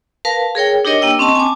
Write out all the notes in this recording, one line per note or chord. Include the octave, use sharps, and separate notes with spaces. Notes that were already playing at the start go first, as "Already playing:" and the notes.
A#4 B4 F5 A5
G#4 A#4 C#5 G5
D4 D#4 G4 A#4 C#5 D#5
A#3 D4 G5 E6
C4 C#4 D#5 A5 C6
G#5 A5 D6